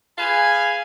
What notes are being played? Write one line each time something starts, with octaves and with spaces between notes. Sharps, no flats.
G#4 B4 F5 G#5